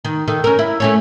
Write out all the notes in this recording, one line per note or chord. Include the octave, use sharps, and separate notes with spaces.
D#3
D#3 A4
C#4 A#4
E4
A3 C#4 C#5